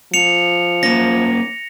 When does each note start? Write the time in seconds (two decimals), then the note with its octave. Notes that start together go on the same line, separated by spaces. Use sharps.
0.14 F3 C#7 F7
0.83 A#3 C#4 A#6